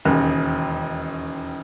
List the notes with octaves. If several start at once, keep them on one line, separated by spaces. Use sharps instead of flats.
E1 D#2 C#3